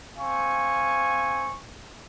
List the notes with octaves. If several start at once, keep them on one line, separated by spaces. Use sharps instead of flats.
C4 F5 G#5 C#6